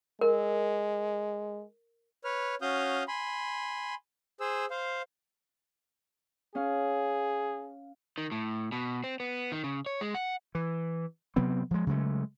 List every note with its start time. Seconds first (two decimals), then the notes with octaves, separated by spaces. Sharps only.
0.21 G#3 A#4
2.24 B4 C#5 F6
2.62 C#4 F#4 F5 D#6 F6 G6
3.08 G#5 B5 C6
4.40 G#4 C5 E6
4.70 C5 F5
6.55 C#4 G#4 F5
8.18 D#3
8.32 A2
8.72 B2
9.04 C4
9.20 B3
9.52 D#3
9.64 C#3
9.86 C#5
10.01 G#3
10.15 F#5
10.55 E3
11.36 C3 F#3 B3 C4
11.71 F3 G#3
11.87 C#3 F#3 G#3 A3